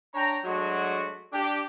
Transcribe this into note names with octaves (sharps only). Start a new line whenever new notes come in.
D4 C#5 G5 A#5
F#3 G#3 A3 D4 F#4
D4 G4